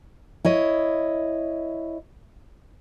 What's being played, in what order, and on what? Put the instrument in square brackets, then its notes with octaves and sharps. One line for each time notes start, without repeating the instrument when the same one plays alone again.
[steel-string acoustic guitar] E4 C#5 D#5